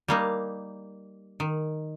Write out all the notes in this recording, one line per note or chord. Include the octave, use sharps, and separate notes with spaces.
G3 A#3 D#4
D#3